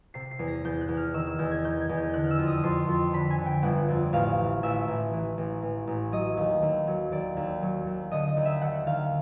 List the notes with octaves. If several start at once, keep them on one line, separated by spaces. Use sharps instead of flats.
C3 C7
C7
E2
A#6
E2 G6
F#6
E2
F6
D#3 E6
E6
E2 G6
G#6
D#3 G6
G#6
E2
G6
D3 F#6
F6
E6
F2
D#6
F2 C6
F2 C6
D3 B5
G#5
D3
G5
G1 F#5
F2
A1 F5
E3
A1 E5
A1
E3
A1
A1
A1
F#3 D#5
D#2
D#2
F#3
D#2 D5
D#2
F#3
D#2
D3 D#5
D#5
D#2
E5
D3 F#5
D#2 F5